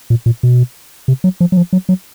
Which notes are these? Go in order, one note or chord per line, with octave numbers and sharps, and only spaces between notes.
A#2
A#2
B2
C3
F#3
F3
F#3
F3
F#3
F#3